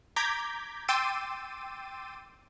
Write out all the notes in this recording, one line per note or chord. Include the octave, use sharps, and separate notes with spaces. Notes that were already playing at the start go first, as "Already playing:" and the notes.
A#5 D6 G6 G#6 B6
G5 C6 D6 E6 A6 D#7